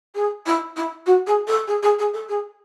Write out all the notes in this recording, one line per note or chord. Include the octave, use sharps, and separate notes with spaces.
G#4
E4
E4
F#4
G#4
A4
G#4
G#4
G#4
A4
G#4